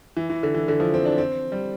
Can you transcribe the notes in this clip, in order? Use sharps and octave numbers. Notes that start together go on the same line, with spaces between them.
E3
E3
D3
E3
D3
F3
C4
D4
C4
G3